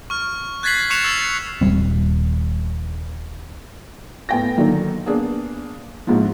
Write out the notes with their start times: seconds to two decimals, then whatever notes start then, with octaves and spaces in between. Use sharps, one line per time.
0.10 C#6 F6
0.63 F#6 G#6 A6 B6 C7 F#7
0.90 C#6 F#6 C#7 E7 F7
1.04 E6 A6 C7
1.61 D#1 F#2 G3 C4
4.29 A2 A3 B3 G5 G#5 A#6
4.57 D3 D#3 F#3 A#3
5.06 A#3 B3 D4 G#4
6.07 A#1 G#2 F3